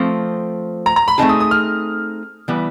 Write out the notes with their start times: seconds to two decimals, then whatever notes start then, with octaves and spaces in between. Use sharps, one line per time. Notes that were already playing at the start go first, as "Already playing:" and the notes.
Already playing: F3 A3 C4
0.86 A#5
0.96 A#5
1.08 B5
1.18 A3 C4 D#4 G#4 A5
1.29 D#6
1.40 D#6
1.51 F6
2.48 E3 G3 B3